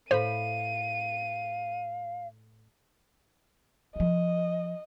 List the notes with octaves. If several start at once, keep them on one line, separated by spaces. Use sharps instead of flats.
A2 C5 F5 B5 D#7
F3 D4 D#5